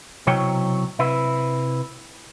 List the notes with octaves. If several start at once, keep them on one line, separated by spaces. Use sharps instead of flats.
B1 C3 F#3 E4 C#5 G5
C3 E4 B4